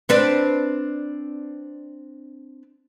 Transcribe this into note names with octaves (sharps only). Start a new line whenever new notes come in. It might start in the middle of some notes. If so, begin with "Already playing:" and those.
C4 D4 B4